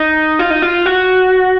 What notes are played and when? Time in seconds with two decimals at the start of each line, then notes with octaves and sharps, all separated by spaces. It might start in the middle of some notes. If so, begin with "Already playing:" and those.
Already playing: D#4
0.39 F4
0.51 D#4
0.62 F4
0.86 F#4